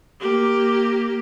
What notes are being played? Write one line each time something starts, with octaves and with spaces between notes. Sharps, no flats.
A#3 G4